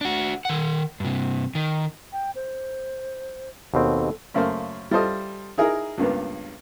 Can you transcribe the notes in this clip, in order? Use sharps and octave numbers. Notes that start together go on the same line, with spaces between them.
D4 F#4
D#3 F#5
G2 C3
D#3
G5
C5
D#2 B2 C4 A4
F#2 C#3 A3 A#3 C5 F5
G3 E4 F4 A4 C5 D#5
D#4 E4 G#4 A#4
C#2 G2 A#3 B3